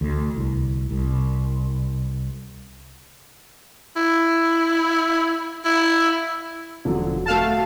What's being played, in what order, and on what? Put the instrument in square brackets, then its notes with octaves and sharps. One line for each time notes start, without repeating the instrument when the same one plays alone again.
[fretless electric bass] D2
C2
C2
[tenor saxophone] E4
E4
[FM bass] E1 [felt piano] D3 F3 F#3
[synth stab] A3 F5 A5 [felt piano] F#4 A4